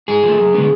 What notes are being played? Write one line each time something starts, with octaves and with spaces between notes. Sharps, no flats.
G#2 G#4
F3
A3
F#2
D3 G#3 B3 D4